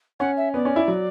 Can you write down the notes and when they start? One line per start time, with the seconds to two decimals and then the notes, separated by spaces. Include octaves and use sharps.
0.19 C#4 F#5
0.37 E5
0.54 B3 D5
0.65 C#4
0.76 E4
0.88 F#3